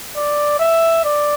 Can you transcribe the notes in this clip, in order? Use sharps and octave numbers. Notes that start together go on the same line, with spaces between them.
D5
E5
D5